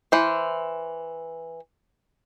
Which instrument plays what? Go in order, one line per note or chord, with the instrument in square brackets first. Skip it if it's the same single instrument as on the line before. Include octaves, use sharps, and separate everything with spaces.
[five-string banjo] E3 C5